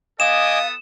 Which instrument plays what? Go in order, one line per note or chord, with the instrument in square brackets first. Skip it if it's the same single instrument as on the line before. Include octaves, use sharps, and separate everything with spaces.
[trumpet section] B3 A4 D#6 [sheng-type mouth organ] D#5 G#5 D6 [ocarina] F5 [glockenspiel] E7